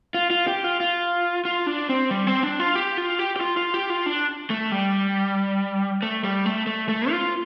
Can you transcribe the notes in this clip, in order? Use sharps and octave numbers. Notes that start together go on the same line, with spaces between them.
F4
F4
G4
F4
F4
F4
D4
C4
G3
C4
D4
F4
G4
F4
G4
G4
F4
F4
G4
F4
D4
A3
G3
A3
G3
A3
A3
A3
F4